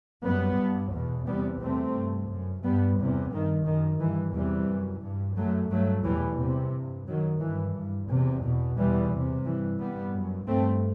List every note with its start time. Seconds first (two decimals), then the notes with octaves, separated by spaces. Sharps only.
0.25 F#2 G3 B3
0.59 G2
0.94 E2 B2
1.27 E2 C3 G3 B3
1.62 E2 C3 A3 C4
1.96 G2
2.30 F#2
2.64 G2 G3 B3
2.99 E2 C3
3.32 G2 D#3
3.66 F#2 D#3
4.00 G2 E3
4.35 E2 C3 E3 G3
4.69 F#2
5.03 G2
5.37 F#2 F#3 A3
5.70 G2 F#3 A3
6.04 E2 B2 E3 G3
6.38 E2 C3
6.74 G2
7.07 F#2 D#3 F#3
7.41 G2 E3
7.75 G2
8.10 E2 C3
8.44 E2 B2
8.77 E2 B2 E3 G3
9.11 E2 C3
9.46 G2 E3 G3
9.79 G2 G3 B3
10.14 F#2
10.48 G2 A3 C4